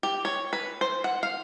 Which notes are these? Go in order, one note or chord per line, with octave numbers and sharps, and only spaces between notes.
G4
C#5
B4
C5
F#5
F5